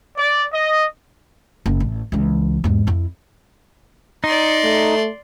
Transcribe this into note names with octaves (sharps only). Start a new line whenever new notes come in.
D5
D#5
F#1
A1
C#2 E3
E2 G#2
F2 E4
D#4 D5 C6
A3